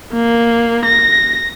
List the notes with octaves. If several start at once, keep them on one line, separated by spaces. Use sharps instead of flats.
A#3
A#6